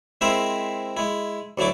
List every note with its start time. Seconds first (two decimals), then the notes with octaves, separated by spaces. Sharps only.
0.21 G#3 C4 E4 A#4 C5 E5
0.97 G#3 E4
1.58 D2 F#3 A3 E4 D6